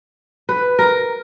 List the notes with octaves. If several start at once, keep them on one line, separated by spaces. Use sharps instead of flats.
B4
A#4